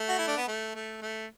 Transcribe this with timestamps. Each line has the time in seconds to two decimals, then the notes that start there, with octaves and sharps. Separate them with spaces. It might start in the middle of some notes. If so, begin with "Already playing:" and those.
Already playing: A3
0.09 F#4
0.18 E4
0.27 D4
0.37 B3
0.48 A3
0.75 A3
1.02 A3